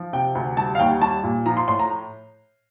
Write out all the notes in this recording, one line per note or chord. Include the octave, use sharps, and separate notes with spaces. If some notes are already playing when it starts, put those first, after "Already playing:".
Already playing: F3
C3 G5
D2
G3 A5
F5
D#2 G5
G3 A5
A#2
F3 A#5
C6
A2 C6
A#5